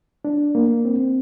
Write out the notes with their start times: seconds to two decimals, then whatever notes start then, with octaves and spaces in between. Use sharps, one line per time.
0.25 D4
0.55 A#3
0.85 C4